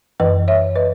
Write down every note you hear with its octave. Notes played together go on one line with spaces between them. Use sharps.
F#2 E3 B4 D#5
C#5 E5
B4 D#5